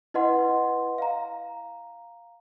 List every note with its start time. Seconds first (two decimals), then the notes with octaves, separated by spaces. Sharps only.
0.14 E4 B4 D#5 F#5 C6
0.98 F5 A#5